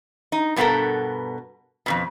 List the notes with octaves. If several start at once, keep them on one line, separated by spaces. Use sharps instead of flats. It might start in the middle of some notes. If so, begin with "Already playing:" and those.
D#4
G2 B2 B3 C4 A4 A#4
F2 G#2 B2